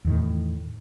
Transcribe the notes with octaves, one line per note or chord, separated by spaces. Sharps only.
E2 A2 D#3